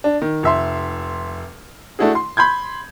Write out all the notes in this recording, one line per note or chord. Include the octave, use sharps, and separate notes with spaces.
D4
D#3
F1 E5 C6
A3 D4 E4 F#4 G#4
C6
B5 C6 G6 G#6